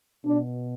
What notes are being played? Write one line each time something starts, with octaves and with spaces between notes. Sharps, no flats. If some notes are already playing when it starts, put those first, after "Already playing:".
B2 D4